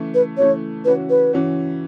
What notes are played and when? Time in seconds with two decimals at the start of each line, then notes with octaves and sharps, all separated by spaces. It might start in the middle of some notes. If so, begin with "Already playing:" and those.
Already playing: C#3 E3 A3
0.14 B4
0.37 C#3 E3 A3 C#5
0.85 C#3 E3 C#4 F#4 B4
1.10 B4
1.33 C#3 E3 C#4 F#4